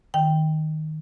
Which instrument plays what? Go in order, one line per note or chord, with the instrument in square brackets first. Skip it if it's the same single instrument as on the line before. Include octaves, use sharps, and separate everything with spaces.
[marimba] D#3 G5